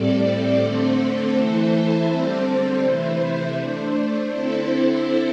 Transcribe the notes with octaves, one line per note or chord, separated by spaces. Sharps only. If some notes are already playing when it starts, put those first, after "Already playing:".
Already playing: A2 G3 C4 A4 D5
D3 A3 C4 A4 C5
E3 A3 E4 A4 C5
D3 G3 C4 A4 C5
C3 E3 A3 E4 C5
A3 D4 C5
D3 C4 E4 A4 C5